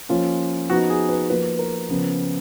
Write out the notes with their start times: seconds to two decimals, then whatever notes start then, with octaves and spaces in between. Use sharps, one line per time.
0.09 F3 A#3 C#4 F4
0.69 F3 B3 D#4 F#4
0.90 G#4
1.09 B4
1.29 F3 A#3 F4 B4
1.59 A#4
1.89 C#3 F3 B3